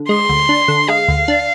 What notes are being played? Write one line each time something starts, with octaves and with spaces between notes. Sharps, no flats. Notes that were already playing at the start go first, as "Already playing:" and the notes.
Already playing: D3
G#3 C6
D2
D4
D3
G#3 F5
D2
D4